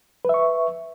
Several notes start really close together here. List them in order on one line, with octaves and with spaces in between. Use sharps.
B4 E5 C#6